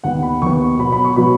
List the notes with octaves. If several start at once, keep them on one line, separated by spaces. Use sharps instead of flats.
D#2 D#3 B3 F#5
B5
D#2 D#3 B3 C#6
B2 F#3 B3 B5
B5
C#6
B2 F#3 B3 B5